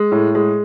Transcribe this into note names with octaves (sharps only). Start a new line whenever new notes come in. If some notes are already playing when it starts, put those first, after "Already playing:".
Already playing: G#3
A2
G#3